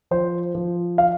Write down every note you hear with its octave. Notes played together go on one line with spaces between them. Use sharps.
F3 C5
F3
F5